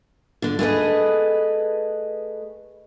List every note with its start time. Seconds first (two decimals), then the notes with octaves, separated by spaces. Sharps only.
0.42 D3 D4
0.59 A3 G#4 B4 D#5